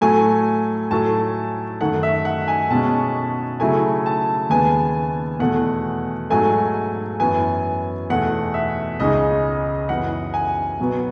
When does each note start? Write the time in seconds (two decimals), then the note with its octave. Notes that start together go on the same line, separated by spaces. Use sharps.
0.01 A2 F#3 A3 G#5
0.91 A2 F#3 A3 A5
1.80 F#2 D#3 A3 D#4 F#5
2.03 E5
2.25 F#5
2.48 G#5
2.71 B2 G#3 C#4 A5
3.60 C#3 F#3 A3 E4 G#5
4.06 A5
4.50 D#2 C#3 G#3 B3 G#5
5.40 E2 B2 A3 F#5
6.30 G#2 F#3 A3 G#5
7.20 F#2 E3 B3 G#5
8.10 E2 B2 A3 F#5
8.54 E5
9.00 C#2 C#3 G#3 D#4 D#5
9.89 F#2 E3 B3 F#5
10.34 G#5
10.79 B2 F#3 B3